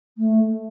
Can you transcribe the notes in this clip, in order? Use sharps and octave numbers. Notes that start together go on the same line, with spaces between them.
A3